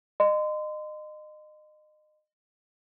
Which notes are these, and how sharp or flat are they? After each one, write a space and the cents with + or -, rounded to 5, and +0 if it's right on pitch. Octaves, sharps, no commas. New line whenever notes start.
D#5 -30 C6 -30